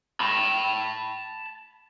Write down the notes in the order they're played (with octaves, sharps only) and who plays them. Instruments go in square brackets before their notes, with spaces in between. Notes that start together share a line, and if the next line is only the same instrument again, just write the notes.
[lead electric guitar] A5 B5